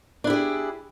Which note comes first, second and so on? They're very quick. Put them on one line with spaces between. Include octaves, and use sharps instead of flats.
D4 E4 G4 G#4